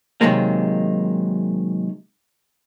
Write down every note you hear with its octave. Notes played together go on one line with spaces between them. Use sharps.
C3 D#3 F#3 G#3 A#3